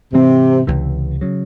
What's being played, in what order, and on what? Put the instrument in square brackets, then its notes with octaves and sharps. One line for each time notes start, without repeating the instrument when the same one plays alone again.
[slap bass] G#2 E3 C4 [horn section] C3
[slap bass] C#2 C3 E3
C#3 F#3